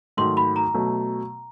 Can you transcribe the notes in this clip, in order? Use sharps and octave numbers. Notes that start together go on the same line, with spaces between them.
G#2 D#3 F#3 A3 C6
B5
A#5
B2 F#3 A3